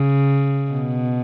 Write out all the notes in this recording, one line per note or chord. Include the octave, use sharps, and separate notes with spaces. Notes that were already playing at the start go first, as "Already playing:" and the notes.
Already playing: C#3
B2